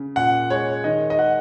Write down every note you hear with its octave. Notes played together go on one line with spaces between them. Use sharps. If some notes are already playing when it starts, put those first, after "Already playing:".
Already playing: C#3
A#2 F#5
G#3 C#5
D#3 D#5
D#5
G#3 F#5